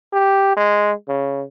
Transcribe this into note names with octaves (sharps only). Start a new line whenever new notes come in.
G4
G#3
C#3